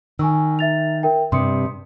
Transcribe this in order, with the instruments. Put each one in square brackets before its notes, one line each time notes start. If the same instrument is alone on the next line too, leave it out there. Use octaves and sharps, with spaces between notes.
[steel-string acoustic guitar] D#3 [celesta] G#5 C#6 E6
[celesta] E5 A6 F7
A#4 E5 G5
[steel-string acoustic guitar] G2 C3 [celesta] C6 D#6 C#7